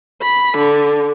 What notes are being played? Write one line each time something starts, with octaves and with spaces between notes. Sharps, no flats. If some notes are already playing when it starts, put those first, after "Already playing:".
B5
D3